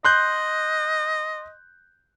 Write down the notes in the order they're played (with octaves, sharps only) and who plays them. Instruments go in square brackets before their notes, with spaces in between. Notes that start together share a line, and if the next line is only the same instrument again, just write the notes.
[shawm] D#5 [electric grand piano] C6 F#6 G6